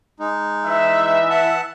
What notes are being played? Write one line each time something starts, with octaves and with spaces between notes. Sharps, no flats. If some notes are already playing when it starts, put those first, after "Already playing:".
G#3 D#4
E3 E5
F#5 A5